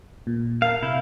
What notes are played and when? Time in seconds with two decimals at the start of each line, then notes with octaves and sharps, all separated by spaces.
0.27 A#2
0.62 A#4 F5 A5
0.83 C3 E4 G6